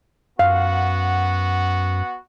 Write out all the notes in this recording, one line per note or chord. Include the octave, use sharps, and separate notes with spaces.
F#2 B3 F#4 F5 F#5